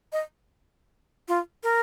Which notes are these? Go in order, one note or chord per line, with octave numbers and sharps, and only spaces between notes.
D#5
F4
A#4